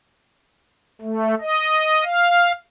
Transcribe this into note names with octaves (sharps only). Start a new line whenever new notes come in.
A3
D#5
F5